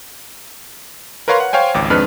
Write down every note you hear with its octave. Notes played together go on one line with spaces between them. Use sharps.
A#4 B4 C#5 F5 A#5 C6
F#5
C5 C#5 F5 G5 G#5
G#1 C#2 D6
G#1 F2 G#3 D4 B4 F6